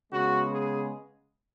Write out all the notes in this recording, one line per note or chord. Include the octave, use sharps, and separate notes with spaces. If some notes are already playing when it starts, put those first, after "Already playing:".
C#3 G#3 B3 F#4
G#4